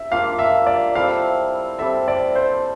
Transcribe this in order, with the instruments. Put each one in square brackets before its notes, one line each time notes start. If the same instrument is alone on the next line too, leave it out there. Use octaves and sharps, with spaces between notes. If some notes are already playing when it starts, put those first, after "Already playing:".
Already playing: [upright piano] E5
[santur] A#3 D4 F4 [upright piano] F5
[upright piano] E5
D5
[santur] G3 C4 E4 A4 [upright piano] F5
[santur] G3 C4 E4 A4 [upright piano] E5
[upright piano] D5
C5